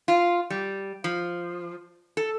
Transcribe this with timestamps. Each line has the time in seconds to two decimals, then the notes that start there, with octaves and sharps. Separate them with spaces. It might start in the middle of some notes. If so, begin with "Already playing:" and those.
0.08 F4
0.50 G3
1.04 F3
2.17 A4